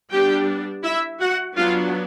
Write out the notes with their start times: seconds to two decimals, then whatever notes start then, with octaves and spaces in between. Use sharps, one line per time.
0.10 G3 B3 D4 G4 G5
0.84 E4 E5
1.20 F#4 F#5
1.56 F#3 B3 D4 F4 F5